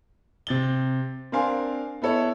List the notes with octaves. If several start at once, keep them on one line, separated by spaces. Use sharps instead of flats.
C3 A6 G7
C4 D4 A#4 F5 G#5 C6
B3 E4 A4 C#5 E5